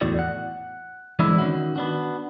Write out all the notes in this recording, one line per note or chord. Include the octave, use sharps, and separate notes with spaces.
E2 A2 F#4 D5
F#5
E3 G#3 B3 C4 D4 E4
D#3 C#4 F#4
B3 D4 F#4